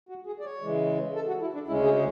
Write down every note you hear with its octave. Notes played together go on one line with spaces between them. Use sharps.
F#4
G#4
D5
C#5
C#3 E3 G#3
A4
F#4
E4
D4
D2 C#3 G#3 C#4 E4
G#4